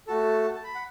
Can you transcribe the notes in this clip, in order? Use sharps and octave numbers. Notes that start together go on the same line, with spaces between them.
A3 F#4 A4 A5
A5
B5
F#5